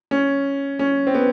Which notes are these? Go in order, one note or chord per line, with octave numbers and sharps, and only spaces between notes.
C#4
C#4
C4
B3